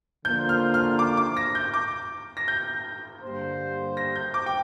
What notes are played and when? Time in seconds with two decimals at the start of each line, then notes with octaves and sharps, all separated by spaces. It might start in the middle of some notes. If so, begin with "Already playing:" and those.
0.25 D3 F3 A#3 F4 C5 G6
0.49 F6
0.74 F6
0.99 D6
1.17 D6
1.37 A#6
1.55 G6
1.74 D6
2.37 A#6
2.48 G6
3.22 G2 D3 A#3 G4 C5
3.97 A#6
4.16 G6
4.34 D6
4.46 G5